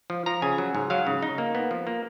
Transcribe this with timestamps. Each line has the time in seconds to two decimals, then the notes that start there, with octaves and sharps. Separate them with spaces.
0.10 F3
0.26 F3 A#5
0.42 C#3 G#5
0.58 F#3
0.75 G#2
0.90 F#3 F5
1.07 C#3
1.22 D#4
1.38 A#3
1.55 B3
1.71 F3
1.87 A#3